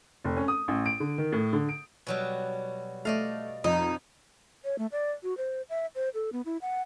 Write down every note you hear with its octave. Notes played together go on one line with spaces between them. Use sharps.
F1
C#4
D#6
A1
D7
D3
D#3
A2
D3
D7
B2 F#3 G3
A3 D5 D#5 F5
F2 D#4
C#5
A3
D5
F#4
C5
E5
C5
A4
B3
E4
F#5